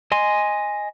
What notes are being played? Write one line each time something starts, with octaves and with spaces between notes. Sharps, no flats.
D#5 G#5 C6